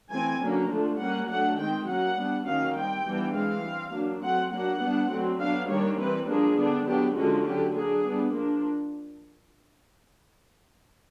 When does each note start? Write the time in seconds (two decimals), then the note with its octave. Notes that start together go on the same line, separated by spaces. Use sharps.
0.11 E3 A3 C4 G#5
0.41 D3 F#3 A#3 C#4
0.70 D3 F3 A3 D4
0.99 G3 A#3 C#4 F#5
1.29 F#3 A3 D4 F#5
1.58 D#3 G#3 C4 G5
1.88 F#3 A#3 C#4 F#5
2.17 G3 B3 D4
2.46 D#3 F#3 A#3 C#4 F5
2.76 G3 C4 G5
3.05 E3 G3 B3 D4
3.34 E3 G#3 C4 F5
3.64 G3 C4
3.93 F#3 A#3 D4
4.23 F#3 A3 C4 F#5
4.52 F#3 A#3 D4 F#5
4.81 G3 B3 D4
5.11 D3 F#3 A3 C4
5.40 F#3 B3 D4 F5
5.69 D#3 G3 A#3 D4 C#5
5.99 E3 G3 C4 B4
6.28 F3 A#3 D4 G#4
6.58 D3 G3 B3 D4
6.87 F#3 B3 D4 G4
7.16 D3 F3 G#3 C#4 F#4
7.45 D3 F#3 A3 G4
7.75 F#3 A#3 D4 G#4
8.05 G3 B3 D4
8.34 F3 A#3 D4